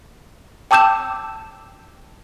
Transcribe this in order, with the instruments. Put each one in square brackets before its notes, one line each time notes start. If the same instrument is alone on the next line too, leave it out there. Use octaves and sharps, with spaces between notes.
[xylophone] G5 A5 D6 E6 G6 E7